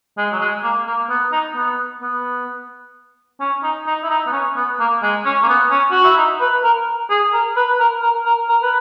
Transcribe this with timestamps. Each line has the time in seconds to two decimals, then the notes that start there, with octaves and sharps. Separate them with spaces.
0.17 G#3
0.32 F#3
0.40 G#3
0.63 A#3
0.87 A#3
1.09 B3
1.32 D#4
1.56 B3
2.02 B3
3.40 C#4
3.63 D#4
3.87 D#4
4.03 E4
4.10 D#4
4.27 B3
4.32 C#4
4.56 B3
4.80 A#3
5.03 G#3
5.25 C#4
5.43 A#3
5.49 B3
5.71 C#4
5.91 F#4
6.04 E4
6.17 D#4
6.40 B4
6.63 A#4
7.10 G#4
7.33 A#4
7.57 B4
7.80 A#4
8.02 A#4
8.26 A#4
8.49 A#4
8.62 B4